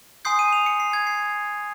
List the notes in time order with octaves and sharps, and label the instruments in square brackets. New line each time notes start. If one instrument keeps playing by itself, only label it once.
[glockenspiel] G#5 C6 D#6 G6 C7
D#7
F7
C#7
C7
G#6
C7